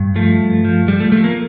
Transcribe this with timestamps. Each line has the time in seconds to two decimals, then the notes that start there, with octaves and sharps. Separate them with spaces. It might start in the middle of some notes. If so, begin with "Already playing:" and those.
Already playing: G2
0.16 F3 A3
0.40 G2
0.65 F3
0.88 F3 G3
1.00 A3
1.12 F3 A3
1.24 A#3